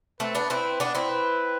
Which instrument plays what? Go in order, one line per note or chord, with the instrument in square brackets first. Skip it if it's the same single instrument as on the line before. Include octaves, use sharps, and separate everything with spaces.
[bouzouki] A3 C4 [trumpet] B4
[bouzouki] B3 D4
[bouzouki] C4 E4 [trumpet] B4
[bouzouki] B3 D4
C4 E4
[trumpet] B4